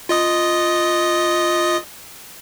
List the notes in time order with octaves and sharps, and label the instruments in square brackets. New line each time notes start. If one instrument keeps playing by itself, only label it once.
[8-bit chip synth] F4 D#5 D#6